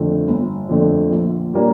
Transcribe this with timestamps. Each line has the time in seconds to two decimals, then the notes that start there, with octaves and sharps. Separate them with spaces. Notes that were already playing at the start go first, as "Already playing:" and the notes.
Already playing: F2 D3 A3
0.28 G1
0.69 F2 D3 A3
1.11 A#1
1.54 A#2 G3 A#3 D4